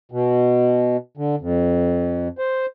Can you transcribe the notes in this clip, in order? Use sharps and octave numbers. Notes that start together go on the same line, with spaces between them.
B2
D3
F2
C5